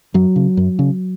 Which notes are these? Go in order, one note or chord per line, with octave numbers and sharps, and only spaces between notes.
F#2 F#3
C#3
F#2
C#3